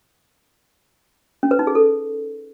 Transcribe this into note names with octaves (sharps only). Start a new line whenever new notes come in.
C#4
B4
D#4
G#4
A4